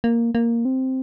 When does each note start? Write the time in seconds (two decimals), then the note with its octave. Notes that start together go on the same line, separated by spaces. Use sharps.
0.04 A#3
0.35 A#3
0.65 C4